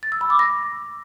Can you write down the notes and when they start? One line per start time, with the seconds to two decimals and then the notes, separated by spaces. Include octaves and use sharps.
0.03 A6
0.12 E6
0.21 B5
0.30 D6
0.39 A#6